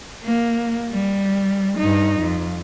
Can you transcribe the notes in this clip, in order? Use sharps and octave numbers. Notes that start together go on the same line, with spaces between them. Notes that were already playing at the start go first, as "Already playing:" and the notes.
A#3
G3
G2 D#4
F2